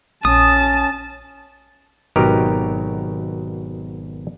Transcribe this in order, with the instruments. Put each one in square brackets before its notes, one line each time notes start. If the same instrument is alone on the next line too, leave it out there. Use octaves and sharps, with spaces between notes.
[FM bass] A#1 [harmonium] C#4 [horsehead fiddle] A5 [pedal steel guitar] D#6
[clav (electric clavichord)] G#1 B2 F#3 D#4 G4 A#4